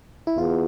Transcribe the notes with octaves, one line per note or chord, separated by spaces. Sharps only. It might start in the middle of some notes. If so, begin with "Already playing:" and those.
E4
E2 F4